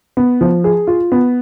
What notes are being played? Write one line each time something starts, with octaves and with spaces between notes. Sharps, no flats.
B3
F3
G#4
F4
B3